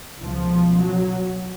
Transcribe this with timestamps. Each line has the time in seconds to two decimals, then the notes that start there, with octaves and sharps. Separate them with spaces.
0.19 C#2 B2 F3
0.78 F#3